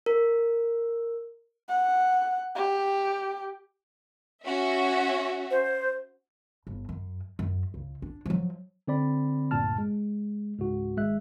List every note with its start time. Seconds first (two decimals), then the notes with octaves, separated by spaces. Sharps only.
0.06 A#4
1.69 F#5
2.55 G4
4.44 C#4 F#4 E5
5.51 C5
6.67 G1
6.89 F#2
7.39 F#2
7.74 C#2
8.02 D4
8.26 F3 F#3
8.88 D3 C4 D5 B5
9.51 A1 D2 G2 A#2 A5 F6
9.78 G#3
10.59 C#2 G#2 F#4
10.97 G#1 G#3 E5 F#6